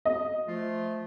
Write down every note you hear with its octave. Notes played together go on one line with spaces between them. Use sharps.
D#5
F3 A3 F4